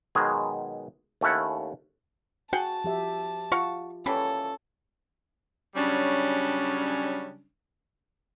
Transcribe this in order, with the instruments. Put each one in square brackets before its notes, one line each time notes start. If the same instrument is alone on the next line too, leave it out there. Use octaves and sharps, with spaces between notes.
[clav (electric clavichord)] B2 D#3 F#3 G#3 G#4
D#2 A3 C#4 E4 F#5
[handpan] F#4 [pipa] G#4 F#5 G5 [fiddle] A5
[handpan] F3 G4 E5
[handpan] F4 [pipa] F#4 F5 C#6
[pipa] E3 G3 A#3 [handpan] C#4 C#5 [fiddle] A4
[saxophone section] C#3 F#3 G3 C#4 D4